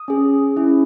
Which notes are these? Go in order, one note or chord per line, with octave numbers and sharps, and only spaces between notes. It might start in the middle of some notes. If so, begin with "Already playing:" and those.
Already playing: D#6
C#4 G#4
C#4 E4 G#4